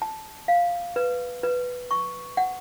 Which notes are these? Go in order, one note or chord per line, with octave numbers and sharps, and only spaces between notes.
A5
F5
B4
B4
C#6
F#5